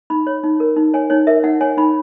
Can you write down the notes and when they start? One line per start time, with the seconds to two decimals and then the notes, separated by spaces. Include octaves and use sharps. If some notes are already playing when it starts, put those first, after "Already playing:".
0.10 D#4 B5
0.27 C#5
0.44 D#4
0.60 A#4
0.76 D#4
0.94 C#5 G#5
1.10 D#4 C#5
1.27 A#4 E5
1.43 D#4 F#5
1.61 C#5 G#5
1.77 D#4 B5